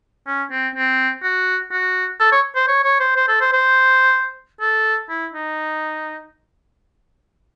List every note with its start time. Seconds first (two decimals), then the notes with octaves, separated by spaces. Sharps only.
0.27 C#4
0.51 C4
0.75 C4
1.23 F#4
1.72 F#4
2.20 A4
2.32 C#5
2.55 C5
2.68 C#5
2.84 C#5
3.00 C5
3.16 C5
3.28 A4
3.41 C5
3.53 C5
4.60 A4
5.09 E4
5.33 D#4